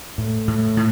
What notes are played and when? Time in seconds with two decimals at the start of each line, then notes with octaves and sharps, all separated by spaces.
0.18 A2
0.48 A2
0.77 A2